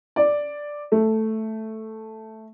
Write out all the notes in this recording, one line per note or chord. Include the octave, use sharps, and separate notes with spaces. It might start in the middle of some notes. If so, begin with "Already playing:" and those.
D5
A3